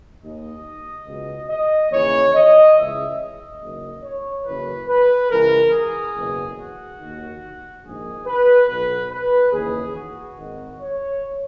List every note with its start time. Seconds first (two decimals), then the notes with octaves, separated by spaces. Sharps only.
0.22 D#2 D#3 D#5
1.07 C#2 B2
1.49 D#5
1.91 D#2 C#3 E3 C#5
2.34 D#5
2.76 C#2 C#3 E3 E5
3.19 D#5
3.61 F#1 F#2 D#3
4.03 C#5
4.45 F#1 F#2 E3 B4
4.87 B4
5.30 C#2 C#3 E3 A#4
5.72 G#4
6.14 F#1 E2 B2
6.56 F#4
6.98 D#2 D#3
7.84 A#1 G#2 D#3 G#4
8.26 B4
8.68 B1 B2 B4
9.10 B4
9.52 D#2 C#3 E3 G#4
9.95 F#4
10.37 G#1 G#2 D#3
10.80 C#5